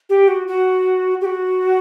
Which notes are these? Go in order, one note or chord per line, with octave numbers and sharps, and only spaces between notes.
G4
F#4
F#4
G4
F#4